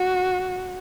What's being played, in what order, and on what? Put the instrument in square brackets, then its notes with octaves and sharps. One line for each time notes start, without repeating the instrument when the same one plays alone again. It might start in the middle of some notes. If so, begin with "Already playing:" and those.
Already playing: [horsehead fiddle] F#4